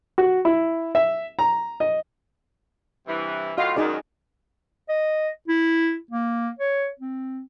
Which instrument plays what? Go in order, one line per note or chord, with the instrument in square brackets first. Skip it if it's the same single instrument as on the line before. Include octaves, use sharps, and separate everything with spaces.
[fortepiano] F#4
E4
E5
A#5
D#5
[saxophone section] G2 C3 E3
[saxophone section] A2 F4 [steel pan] F#4 D#5 F5
[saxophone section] F#2 D#3 [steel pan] D#4 G#4 D5
[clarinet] D#5
E4
A#3
C#5
C4